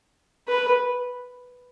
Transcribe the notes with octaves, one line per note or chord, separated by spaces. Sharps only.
B4